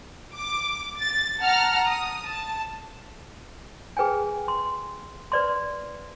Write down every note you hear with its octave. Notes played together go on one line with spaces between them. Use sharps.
D6
A6
F#5 A5 A#5 F6
D#6
A5
G#4 B4 G5 G#5
C6
B4 D5 C6